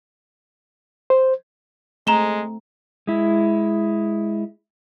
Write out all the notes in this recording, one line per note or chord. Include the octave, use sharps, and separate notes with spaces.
C5
G#3 A3 C4 A#5 E7 G7
G#3 E4